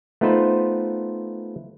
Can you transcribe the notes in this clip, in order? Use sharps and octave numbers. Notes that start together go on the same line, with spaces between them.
A3 B3 D#4 F4 B4 C5